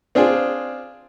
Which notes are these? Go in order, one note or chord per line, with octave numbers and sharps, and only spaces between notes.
C4 D4 F4 G#4